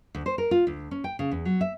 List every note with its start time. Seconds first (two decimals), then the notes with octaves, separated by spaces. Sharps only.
0.15 D2
0.26 C5
0.38 A#4
0.51 F4
0.67 D2
0.91 C#4
1.04 G5
1.19 C#3
1.31 E2
1.45 F#3
1.61 E5